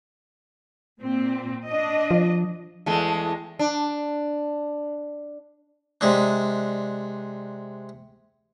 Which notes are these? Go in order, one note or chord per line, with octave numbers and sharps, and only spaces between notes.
A#2 C4
D4 D#5
F3
E2 G#3 A3
D4
C3 G#3 D4